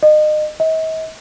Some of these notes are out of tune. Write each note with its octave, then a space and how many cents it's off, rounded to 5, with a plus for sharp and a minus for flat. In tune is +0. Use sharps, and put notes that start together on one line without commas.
D#5 -30
D#5 +45